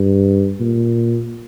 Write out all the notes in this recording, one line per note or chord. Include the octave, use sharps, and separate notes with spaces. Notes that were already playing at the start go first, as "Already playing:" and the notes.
Already playing: G2
A#2